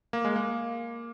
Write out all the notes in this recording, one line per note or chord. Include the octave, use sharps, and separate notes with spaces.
A#3
G#3
A#3